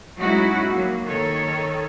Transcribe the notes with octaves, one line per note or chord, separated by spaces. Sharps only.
F#3 G#3 C#4 D#4 E4 F#4
F#3 A#3
D#3 A4 C#5